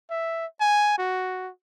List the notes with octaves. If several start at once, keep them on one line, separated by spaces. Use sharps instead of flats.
E5
G#5
F#4